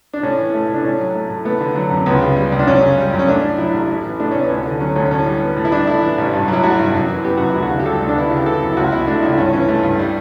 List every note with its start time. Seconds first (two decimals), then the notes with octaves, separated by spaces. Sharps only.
0.13 D4
0.23 A2 C#4
0.39 E3
0.54 A3
0.69 A2 D4
0.84 A2 C#4
1.00 F#3
1.15 A3
1.30 A2
1.45 A3 B3
1.61 D3
1.75 F#3
1.91 F#2
2.06 C#2 B3
2.22 C#3
2.36 G3
2.52 C#2
2.59 D4
2.67 F#2 C#4
2.82 C#3
2.98 G3
3.13 F#2
3.19 C#4
3.28 A3 D4
3.44 A2
3.58 F#3 E4
3.74 A1
3.90 A2
4.04 E3
4.20 A3 D4
4.31 A2 C#4
4.42 B3
4.50 D2 C#4
4.66 D3
4.80 F#3 C#4
4.96 D2 C#4
5.11 A2 C#4
5.26 G3
5.42 B3
5.56 A2
5.65 E4
5.71 G3 D4
5.87 A2 E4
6.02 E3
6.18 A1
6.33 G2
6.48 F#3
6.53 E4
6.63 A3 F#4
6.78 G2
6.94 F#2
7.09 E3
7.24 B3 G4
7.37 F#2 F#4
7.50 E4
7.55 D2
7.62 F#4
7.70 C#3
7.79 G4
7.85 G3 A4
8.01 D2
8.09 D4
8.16 B3 E4
8.28 C#3 F#4
8.37 G4
8.46 E3 A4
8.62 F#2
8.73 E4
8.77 C#2 F#4
8.92 B2 E4
9.07 A3 D4
9.23 C#2 E4
9.37 G2 C#4
9.53 E3 C#4
9.69 A3
9.83 G2
9.99 G3